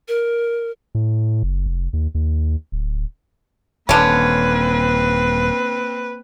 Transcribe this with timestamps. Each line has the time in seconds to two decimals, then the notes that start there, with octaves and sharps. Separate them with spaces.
0.08 A#4
0.95 A2
1.43 F#1
1.66 F1
1.93 D#2
2.15 D#2
2.72 D1
3.89 D#1 D3 A#3 C4 C#4 B4